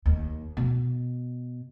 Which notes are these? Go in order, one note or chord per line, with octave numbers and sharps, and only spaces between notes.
D#2
B2